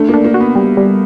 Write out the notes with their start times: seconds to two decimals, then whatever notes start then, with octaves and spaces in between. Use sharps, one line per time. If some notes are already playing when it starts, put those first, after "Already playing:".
Already playing: A3 D4
0.09 A#3
0.14 D4
0.24 A#3
0.34 F#4
0.40 B3
0.56 G3
0.77 G3